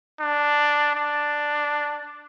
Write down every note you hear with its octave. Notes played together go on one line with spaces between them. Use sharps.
D4
D4